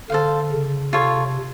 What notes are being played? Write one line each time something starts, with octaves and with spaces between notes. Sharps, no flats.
D3 A4 C5 F5
C#3
C3 F4 A4 C#5